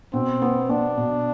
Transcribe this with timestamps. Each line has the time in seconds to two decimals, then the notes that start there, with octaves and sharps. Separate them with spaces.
0.13 B2 C4
0.42 B3
0.69 B3 D4
0.97 B2